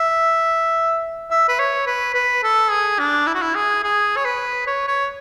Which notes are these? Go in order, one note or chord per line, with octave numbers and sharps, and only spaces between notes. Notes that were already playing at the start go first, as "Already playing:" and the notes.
Already playing: E5
E5
B4
C#5
B4
B4
A4
G#4
D4
E4
F#4
E4
G#4
G#4
C#5
B4
C#5
C#5